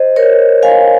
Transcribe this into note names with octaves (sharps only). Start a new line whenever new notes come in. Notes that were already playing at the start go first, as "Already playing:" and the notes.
Already playing: C5 D#5
A#4 C#5
F5 G#5